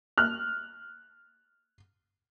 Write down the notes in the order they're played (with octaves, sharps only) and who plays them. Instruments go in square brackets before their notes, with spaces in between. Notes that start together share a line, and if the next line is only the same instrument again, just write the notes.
[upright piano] F6 F#6